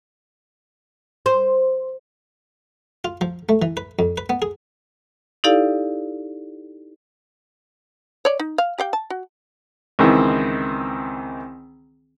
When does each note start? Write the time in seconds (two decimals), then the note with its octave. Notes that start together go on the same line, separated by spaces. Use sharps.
1.26 C5
3.05 F4
3.21 F3
3.49 A3
3.62 E3
3.77 B4
3.99 F2
4.18 B4
4.30 B3
4.42 G#4
5.44 D#4 E4 G4 A4 D5 F5
8.25 C#5 D5
8.40 D#4
8.58 F5
8.78 G4 F5 G5
8.93 A5
9.10 F#4
9.99 C#2 D#3 E3 C4